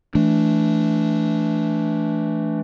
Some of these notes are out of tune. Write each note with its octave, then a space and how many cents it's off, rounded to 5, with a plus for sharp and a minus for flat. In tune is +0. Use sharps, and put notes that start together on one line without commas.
E3 +0 A3 -15 D4 -10